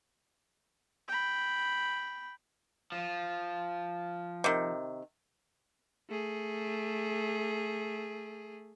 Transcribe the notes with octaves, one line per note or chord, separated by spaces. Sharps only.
G5 B5
F3
C3 D#3
A3 G#4